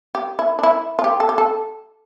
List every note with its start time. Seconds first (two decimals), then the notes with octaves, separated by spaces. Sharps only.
0.15 G4
0.39 E4
0.59 D4
0.63 E4
0.99 F4
1.04 G4
1.20 A4
1.29 G4
1.38 A4